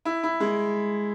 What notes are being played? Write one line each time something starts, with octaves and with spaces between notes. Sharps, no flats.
E4
E4
G#3